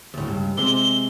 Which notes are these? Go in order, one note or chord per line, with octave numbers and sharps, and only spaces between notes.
D2 A2
C#2 G2
C3 G#3 G7